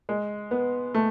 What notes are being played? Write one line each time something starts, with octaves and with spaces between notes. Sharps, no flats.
G#3
B3
A3